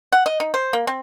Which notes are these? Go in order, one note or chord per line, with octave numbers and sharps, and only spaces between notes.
F#5
D#5
D#4
C5
A#3
C4